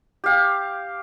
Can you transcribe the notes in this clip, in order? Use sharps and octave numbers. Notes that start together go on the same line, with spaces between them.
G4 F5